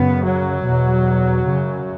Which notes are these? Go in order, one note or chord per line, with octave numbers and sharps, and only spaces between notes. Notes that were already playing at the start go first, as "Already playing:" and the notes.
Already playing: F#2 C#3 B3
F#3
E2 B2
F#2 C#3